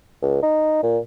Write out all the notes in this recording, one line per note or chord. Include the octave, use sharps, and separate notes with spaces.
C#2
D#4
A#2